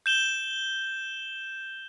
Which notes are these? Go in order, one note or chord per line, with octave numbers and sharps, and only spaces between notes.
G6 E7 G7